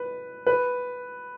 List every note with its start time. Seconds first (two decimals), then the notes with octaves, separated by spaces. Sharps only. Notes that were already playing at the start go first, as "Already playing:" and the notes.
Already playing: B4
0.46 B4